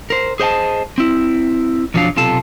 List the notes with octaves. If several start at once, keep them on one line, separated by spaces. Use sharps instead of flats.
A#4 C5
G#4 C5 D#5 G5 A5
C4 E4
B1 F2 F3 F#3 D4 F5
B1 C3 F4 A4 A5